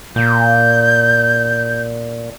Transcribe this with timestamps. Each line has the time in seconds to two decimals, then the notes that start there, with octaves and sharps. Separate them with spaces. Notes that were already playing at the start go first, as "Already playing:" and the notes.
0.16 A#2 G6